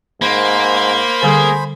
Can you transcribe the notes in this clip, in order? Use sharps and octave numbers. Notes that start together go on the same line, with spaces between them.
G#2 A#3 C5 B5
D3 G3 G#4 A4